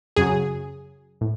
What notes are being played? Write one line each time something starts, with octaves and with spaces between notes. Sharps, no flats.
F#2 C#3 F#3 G#4
A2